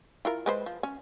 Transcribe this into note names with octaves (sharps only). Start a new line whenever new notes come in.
E4 F4 A#4
G#3 B4 C5
F3
C#4